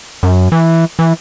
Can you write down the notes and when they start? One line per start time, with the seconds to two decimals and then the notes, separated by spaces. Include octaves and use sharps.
0.23 F#2
0.52 E3
0.99 E3